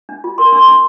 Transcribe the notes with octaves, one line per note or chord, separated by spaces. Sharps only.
D4
F4
A#4 C6
D4 C6
D4